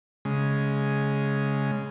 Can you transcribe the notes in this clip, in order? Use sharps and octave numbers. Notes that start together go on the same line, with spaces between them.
C#3 G#3